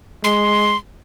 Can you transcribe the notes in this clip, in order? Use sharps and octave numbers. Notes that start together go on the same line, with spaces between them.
G#3 C6